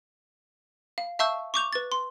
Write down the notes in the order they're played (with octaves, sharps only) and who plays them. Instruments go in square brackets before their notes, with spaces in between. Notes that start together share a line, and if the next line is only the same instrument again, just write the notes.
[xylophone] F5
E5 F5 A5 C#6 E6 G6
C#6 D6 G6 F7
B4 A6
C6